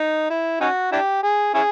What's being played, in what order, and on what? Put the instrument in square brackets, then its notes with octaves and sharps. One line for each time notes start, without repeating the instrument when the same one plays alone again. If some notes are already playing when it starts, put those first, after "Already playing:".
Already playing: [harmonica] D#4
E4
C#4 D#4 F#4
D4 E4 G4
G#4
C#4 E4 G#4